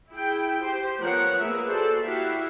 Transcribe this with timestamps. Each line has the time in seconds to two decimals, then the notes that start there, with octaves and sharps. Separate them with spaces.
0.10 E4 G#4 G5
0.62 G4 C5
1.00 F3 B3 A#4 C#5 F#5
1.40 A#3 G#4 A#4 B4 E5
1.68 F#4 A4 C5 D5
2.03 E4 F#4 G4 E5 F5